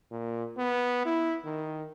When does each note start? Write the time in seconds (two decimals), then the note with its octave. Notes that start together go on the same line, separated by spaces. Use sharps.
0.12 A#2
0.58 B3
1.05 E4
1.46 D#3